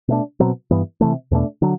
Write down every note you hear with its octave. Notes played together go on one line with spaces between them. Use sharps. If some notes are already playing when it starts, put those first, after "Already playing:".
B2 A3 D4
B2 F#3 C4
G2 E3 B3
C3 E3 A3
E2 B2 A3 D4
D3 F#3